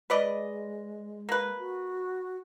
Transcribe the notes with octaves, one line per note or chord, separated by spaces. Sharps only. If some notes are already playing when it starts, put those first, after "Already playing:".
G#3 B4 D5 D#5
A#3 B4
F#4